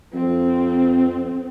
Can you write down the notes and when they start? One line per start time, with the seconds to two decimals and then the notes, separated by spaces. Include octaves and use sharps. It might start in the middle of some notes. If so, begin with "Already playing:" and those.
0.14 F2 C4